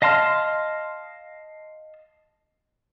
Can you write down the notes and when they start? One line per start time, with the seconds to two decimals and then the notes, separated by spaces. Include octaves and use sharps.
0.02 D#5 F5 A5 C6 F6